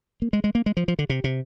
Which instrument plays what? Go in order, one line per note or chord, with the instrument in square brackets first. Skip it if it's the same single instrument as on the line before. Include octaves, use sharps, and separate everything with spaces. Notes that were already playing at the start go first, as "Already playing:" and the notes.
[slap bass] A#3
G#3
G#3
A#3
G#3
F3
F3
D3
C3
C3